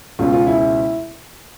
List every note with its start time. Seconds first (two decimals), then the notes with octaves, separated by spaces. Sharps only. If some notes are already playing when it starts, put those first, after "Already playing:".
0.19 C#2 B2 G#3 C#4 F4
0.33 F4
0.47 E4